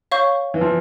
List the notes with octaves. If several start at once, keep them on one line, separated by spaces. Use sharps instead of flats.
C#5 F5 C#6 G6
E3
F3